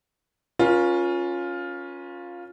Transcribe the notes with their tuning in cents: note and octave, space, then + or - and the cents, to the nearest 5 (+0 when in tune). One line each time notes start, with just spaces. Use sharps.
C#4 +0 F4 +10 A#4 +45